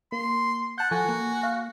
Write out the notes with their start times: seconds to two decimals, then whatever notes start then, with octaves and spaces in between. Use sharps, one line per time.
0.12 A#3 C6
0.78 F#5 A5 G6
0.91 F3 F#4 A4 F#5 G#5
1.09 A#3
1.43 F5